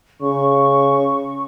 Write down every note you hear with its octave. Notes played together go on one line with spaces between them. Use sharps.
C#3 C#6